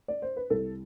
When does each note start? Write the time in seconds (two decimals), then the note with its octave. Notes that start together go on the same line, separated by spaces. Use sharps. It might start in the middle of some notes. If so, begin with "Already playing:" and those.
0.08 D5
0.22 C5
0.36 B4
0.50 C2 A4